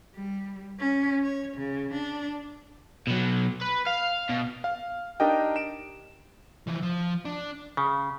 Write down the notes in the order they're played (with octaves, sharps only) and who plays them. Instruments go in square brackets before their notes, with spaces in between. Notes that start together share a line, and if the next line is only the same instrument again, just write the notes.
[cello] G3
C#4
C#5
C#3
D4
[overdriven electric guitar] B2 F#3
B4
F5
B2
[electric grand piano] F5
D4 D#4 G4 A#4 D#5 G5
D7 E7
[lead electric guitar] E3 F3
F3
D4
[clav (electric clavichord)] C#3